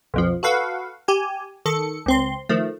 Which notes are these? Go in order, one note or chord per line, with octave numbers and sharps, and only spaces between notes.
B1 F2 F3
F#4 A4 B4 F5 F#5
G4 G#5
D#3 A4 C#7
C#2 C4 C6
D#3 F3 A3